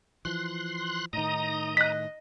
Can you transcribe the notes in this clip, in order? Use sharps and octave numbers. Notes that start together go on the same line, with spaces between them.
E3 F3 C6 F#6
A2 D#3 D#4 A#5 D#6
D#5 F#6 B6